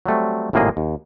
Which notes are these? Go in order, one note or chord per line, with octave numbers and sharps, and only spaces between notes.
F#3 G3 A3 C4
G#1 A2 C3 A#3 G#4 D#5
D#2